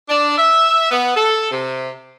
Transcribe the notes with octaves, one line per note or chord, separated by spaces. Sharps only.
D4
E5
B3
A4
C3